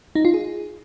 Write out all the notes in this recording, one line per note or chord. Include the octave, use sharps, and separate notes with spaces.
D#4
F4
G#4